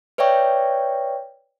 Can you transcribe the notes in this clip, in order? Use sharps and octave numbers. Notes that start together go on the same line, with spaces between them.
B4 C#5 D5 E5 G5 C#6